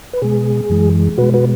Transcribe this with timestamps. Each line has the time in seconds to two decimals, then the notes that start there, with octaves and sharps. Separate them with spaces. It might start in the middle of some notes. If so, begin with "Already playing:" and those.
0.13 B4
0.22 B2 G#3 G#4
0.70 F#2 E3 G#3
1.18 B2 G#3 F#4 B4
1.34 F#4 B4